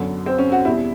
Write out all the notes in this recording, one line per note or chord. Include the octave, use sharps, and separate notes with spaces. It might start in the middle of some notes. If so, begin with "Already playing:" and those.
Already playing: F#2 D3 F#3 B3
C4
C#4
F#4
E2 B2 G3 E4